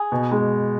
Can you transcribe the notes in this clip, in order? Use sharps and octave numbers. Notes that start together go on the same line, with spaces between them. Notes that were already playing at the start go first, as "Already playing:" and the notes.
Already playing: G#4
B2
G#3